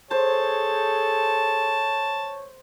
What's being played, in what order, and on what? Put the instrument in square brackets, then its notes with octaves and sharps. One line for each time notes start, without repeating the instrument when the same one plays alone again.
[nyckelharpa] G#4 A4 [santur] C5 [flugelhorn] C#5 [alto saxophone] A5